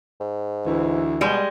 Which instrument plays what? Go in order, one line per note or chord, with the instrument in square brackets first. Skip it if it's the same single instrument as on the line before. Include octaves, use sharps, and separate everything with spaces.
[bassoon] G#2
[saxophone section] D2 E3
[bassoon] B2 [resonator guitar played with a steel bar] G3 G#3